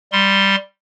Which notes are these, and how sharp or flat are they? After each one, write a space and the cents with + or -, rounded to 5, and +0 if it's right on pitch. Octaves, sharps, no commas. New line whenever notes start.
G3 +0 C6 +0